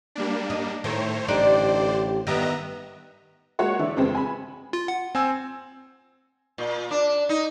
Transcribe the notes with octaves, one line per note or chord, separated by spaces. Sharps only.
G3 A#3 D4
D#4
A2 D#3 A3 C5 C#5
A1 D3 D4 D#4 G4 A4 C5 D5
D#3 G3 B3 D#5 E5 A#5
G#3 A#3 F#4 C#5 F#5
D3 E3 D4 E4
F2 C#3 G#3 B3 C4
G#5 B5
F4
F#5
C4 G#5 E6
A#2
D4
D#4